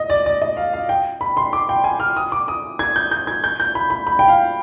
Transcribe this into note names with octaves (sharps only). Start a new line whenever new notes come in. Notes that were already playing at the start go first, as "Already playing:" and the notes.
Already playing: D#5
D5
D5
D#5
F5
F5
G5
B5
C6
D6
G5
G#5
F6
D#6
D6
D#6
G#6
G6
G6
G#6
G6
G6
B5
B5
B5
G5
F5